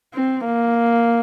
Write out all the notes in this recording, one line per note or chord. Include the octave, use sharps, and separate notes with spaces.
C4
A#3